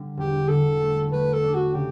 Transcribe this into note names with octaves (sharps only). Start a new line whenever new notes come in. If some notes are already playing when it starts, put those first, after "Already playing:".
Already playing: D3 G3
E1 G4
D3 A4
A3
A3 B4
A4
D4
F#4
C#3 G4